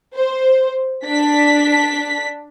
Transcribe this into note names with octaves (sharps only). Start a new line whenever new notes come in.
C5
D4 B6